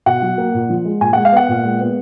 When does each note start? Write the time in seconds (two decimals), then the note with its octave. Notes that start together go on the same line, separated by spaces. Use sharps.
0.06 B2 F#5
0.22 F#3
0.38 A#3
0.54 A#2
0.70 F3
0.85 G#3
1.01 A#2 G#5
1.13 F#5
1.17 G#3
1.25 F5
1.32 B3 F#5
1.49 A#2
1.64 G#3
1.80 B3